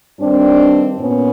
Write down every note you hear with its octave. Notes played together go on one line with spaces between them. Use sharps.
G2 D#3 G3 C4 D4
A#2 B3 C#4